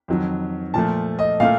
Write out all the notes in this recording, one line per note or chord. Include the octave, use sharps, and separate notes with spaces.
F2 D#3 F#3
A#2 F3 A3 A5
D#5
A#2 A3 F5